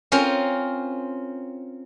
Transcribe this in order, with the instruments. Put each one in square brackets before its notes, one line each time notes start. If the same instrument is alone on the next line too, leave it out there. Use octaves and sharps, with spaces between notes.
[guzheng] C4 C#4 F4 A#4 C5